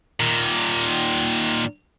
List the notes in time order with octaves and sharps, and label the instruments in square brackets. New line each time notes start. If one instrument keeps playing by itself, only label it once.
[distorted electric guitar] A#2 D#3